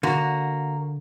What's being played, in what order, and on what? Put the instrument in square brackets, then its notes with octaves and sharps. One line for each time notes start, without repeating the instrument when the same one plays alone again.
[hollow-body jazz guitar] D3 [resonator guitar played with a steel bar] A#3 F#4